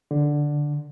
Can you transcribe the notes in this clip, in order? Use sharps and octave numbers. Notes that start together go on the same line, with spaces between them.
D3